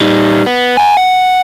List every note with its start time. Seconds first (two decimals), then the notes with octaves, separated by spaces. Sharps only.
0.01 G3 D#4
0.46 B3
0.77 F#5 G#5
0.97 F#5